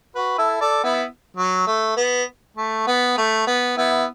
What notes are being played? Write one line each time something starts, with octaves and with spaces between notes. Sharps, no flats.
F#4 B4
E4 A4
A4 D5
B3 E4
F#3
A3
B3
A3
B3
A3
B3
B3 E4